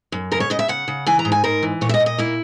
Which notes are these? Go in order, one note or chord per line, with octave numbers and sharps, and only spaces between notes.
F#2
C#3 A#4
C#5
C#3 D#5
E5
C#3 F#5
C#3
E3 G#5
A#5
G#2
G#5
G#2 A#4
E3
A#2 C#5
E5
D#5
A#2
D#5
A#3 E4